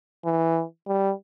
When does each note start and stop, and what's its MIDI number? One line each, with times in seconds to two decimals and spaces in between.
0.25 0.64 52
0.87 1.13 55